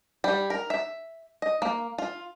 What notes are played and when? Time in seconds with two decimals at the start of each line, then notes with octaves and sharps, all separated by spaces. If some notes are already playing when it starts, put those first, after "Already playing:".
0.24 G3
0.50 A#4
0.70 E5
1.42 D#5
1.62 A#3
1.98 F4